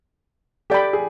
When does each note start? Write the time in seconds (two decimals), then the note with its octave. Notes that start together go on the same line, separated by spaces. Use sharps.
0.70 G4 A4 D5 G5 B5
0.93 G#4